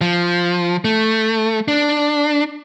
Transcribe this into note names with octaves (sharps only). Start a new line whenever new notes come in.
F3
A3
D4